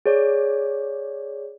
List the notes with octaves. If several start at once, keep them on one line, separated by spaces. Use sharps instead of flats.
G#4 C#5 D5